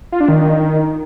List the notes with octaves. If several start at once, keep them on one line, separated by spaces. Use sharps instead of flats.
F4
D4
D#3